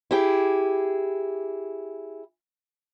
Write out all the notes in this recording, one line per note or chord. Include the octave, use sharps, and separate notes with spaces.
E4 G4 G#4